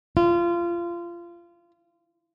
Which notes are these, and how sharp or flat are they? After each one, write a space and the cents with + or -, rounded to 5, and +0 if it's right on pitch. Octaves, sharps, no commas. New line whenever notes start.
F4 -25